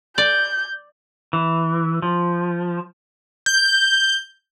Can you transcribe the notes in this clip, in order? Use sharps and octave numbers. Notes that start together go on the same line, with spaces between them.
D5 G6
E3
F3
G6